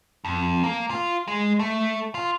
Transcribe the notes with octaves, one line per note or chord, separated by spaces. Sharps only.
F2
A#3
F4
G#3
A3
F4